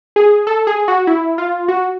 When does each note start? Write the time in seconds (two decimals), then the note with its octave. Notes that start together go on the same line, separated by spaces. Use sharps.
0.16 G#4
0.47 A4
0.67 G#4
0.88 F#4
1.07 E4
1.38 F4
1.68 F#4